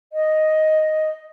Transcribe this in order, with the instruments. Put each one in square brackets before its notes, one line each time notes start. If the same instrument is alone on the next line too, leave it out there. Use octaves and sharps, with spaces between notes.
[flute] D#5